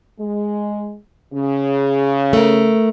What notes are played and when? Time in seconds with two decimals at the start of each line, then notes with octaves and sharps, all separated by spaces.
0.20 G#3
1.34 C#3
2.33 A3 A#4